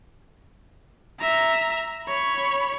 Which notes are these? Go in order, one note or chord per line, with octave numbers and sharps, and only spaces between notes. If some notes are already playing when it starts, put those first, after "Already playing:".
E5 A#5
C#5 B5